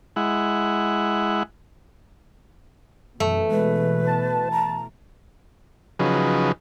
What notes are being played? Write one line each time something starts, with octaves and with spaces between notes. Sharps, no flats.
G#3 E4 F#5
F#2 B2 E3 A3
G#3 B4
A5
A#5
C#3 F3 F#3 D#4 G#4 B4